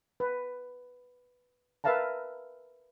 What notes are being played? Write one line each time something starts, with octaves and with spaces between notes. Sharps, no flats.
B4
A#4 B4 E5 F5 A5 A#5